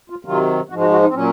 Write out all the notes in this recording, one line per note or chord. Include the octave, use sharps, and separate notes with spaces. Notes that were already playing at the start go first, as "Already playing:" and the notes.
F4
C3 D#3 F#3 F4
G#2 F3 G#3 F#4
F#4
F#4
D#4
C4
A#2 F#3 C#4